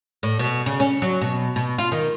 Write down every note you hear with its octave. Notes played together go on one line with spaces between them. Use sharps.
A2
B2
C#3
C#4
F#3
B2
B2
F4
D#3